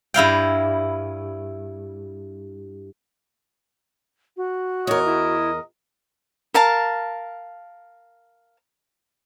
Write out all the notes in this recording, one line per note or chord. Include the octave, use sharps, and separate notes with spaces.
G2 E4 F5 G5
F#4
E2 A#4 C#5 D#5
E4
A#4 F5 A5